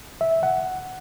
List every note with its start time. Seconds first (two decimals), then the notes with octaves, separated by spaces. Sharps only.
0.21 E5
0.43 F#5